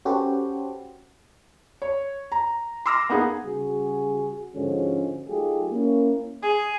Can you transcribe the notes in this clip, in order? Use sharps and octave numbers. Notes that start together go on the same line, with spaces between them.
C#4 F#4 G4 A4 B4 C5
C#5
A#5
C6 D6 E6 F6 A#6
A#3 B3 D#4 G#4
C#3 G3 F#4 G#4
G#2 D3 F3 G#3 C#4 F#4
F#3 A3 D#4 F4 G4 G#4
A#3 C#4 E4
G#4